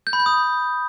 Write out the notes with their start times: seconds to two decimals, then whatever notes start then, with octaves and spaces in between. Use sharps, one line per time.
0.07 G6
0.13 B5
0.20 G6
0.26 D#6